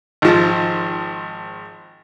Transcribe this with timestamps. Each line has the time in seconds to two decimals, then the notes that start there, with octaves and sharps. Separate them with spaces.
0.22 G#1 F3